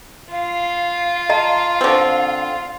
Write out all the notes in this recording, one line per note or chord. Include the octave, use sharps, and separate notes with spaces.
F4 F5
D#5 A5 A#5
D3 C4